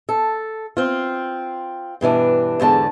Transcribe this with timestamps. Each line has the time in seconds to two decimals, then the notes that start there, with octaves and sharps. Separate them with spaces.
0.09 A4
0.77 C4 F4
2.01 G2 B2 E3 D4
2.60 E2 G#2 D3 A5